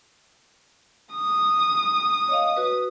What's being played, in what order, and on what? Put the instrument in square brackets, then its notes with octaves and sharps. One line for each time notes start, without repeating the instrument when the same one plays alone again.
[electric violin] D#6
[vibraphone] C#5 D#5 F5
F#4 B4